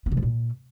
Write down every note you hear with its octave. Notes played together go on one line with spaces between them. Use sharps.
B3
C#3
F3
A#2